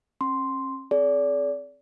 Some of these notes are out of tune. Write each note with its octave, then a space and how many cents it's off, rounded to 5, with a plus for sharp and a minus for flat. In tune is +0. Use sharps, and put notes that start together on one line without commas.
C#4 -45 C6 +0
C4 +0 G#4 +35 D5 -30